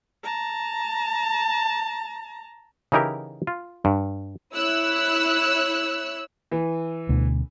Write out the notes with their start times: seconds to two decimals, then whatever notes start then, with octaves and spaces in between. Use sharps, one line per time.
0.24 A5 A#5
2.92 C#3 E3 D#4 E4 G4 A#4
3.47 F4
3.85 G2
4.53 E4 C#5 E6 F#6
6.52 E3
7.09 D2 B2 D3